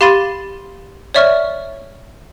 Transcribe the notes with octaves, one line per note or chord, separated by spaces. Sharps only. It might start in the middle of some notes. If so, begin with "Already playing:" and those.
G4 F5 B5 C6 A6 D#7
C#5 D5 E5 C#6 F6